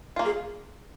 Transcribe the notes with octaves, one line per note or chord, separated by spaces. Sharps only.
A#3 F4
G#4